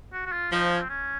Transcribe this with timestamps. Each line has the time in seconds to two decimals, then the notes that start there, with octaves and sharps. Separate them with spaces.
0.13 F#4
0.26 F#4
0.32 F4
0.52 F3 D#4
0.72 C#4
0.81 C4
0.89 C#4